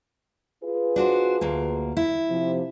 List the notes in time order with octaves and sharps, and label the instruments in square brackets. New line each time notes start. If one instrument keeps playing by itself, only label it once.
[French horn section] F4 G#4 B4
[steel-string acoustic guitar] D4 F#4 C5
D2 A#3
E4
[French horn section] C3 F3